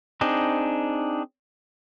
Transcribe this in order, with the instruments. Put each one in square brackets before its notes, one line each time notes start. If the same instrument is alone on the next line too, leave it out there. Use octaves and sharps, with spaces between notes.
[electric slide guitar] C4 D4 D#4 G#4